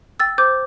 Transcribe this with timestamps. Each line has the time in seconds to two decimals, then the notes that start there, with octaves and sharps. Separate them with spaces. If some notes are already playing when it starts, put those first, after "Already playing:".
0.20 G5 E6 A6
0.38 C5 D6 G6